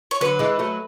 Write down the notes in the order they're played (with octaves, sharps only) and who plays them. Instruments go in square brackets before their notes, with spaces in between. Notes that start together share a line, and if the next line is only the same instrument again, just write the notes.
[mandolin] C#5
[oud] D3 F#3 [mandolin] B4
[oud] E3 G#3
F#3 A3